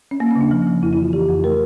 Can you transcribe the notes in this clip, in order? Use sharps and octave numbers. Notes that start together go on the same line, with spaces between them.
C#4
A#3
C#4
C#3
D4
F3
F3
F2 E4
E4
E3 F4
E3 G4
F2
A3 A#4